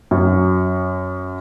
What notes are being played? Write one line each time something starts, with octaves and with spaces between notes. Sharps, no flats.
F#2